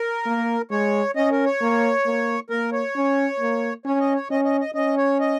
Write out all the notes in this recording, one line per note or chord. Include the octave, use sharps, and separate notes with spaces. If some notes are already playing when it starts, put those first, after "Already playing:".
Already playing: A#4
A#3
G#3 C#5
C#4 D#5
A#4
C#5
A#3
A#3
A#3 A#4
C#5
C#4
A#3
C#4 C#5
D#5
C#5
C#4 D#5
D#5
D#5
C#4 D#5
C#5
D#5